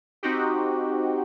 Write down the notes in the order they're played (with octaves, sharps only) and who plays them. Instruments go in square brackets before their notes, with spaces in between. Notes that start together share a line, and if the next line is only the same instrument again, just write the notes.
[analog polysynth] C4 D#4 F#4 G4